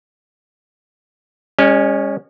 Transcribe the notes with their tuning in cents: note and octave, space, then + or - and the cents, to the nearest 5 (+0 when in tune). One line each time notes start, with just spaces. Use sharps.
G#3 -45 C#4 +0